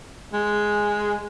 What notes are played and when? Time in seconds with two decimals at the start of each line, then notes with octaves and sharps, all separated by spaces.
0.33 G#3